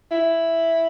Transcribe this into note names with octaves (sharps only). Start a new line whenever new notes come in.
E4